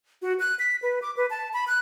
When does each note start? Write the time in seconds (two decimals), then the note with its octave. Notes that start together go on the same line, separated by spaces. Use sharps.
0.22 F#4
0.39 F#6
0.59 B6
0.82 B4
1.02 D6
1.17 B4
1.30 A5
1.53 B5
1.68 F#6